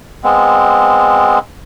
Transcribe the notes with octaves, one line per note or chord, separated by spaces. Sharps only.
G#3 B3 C4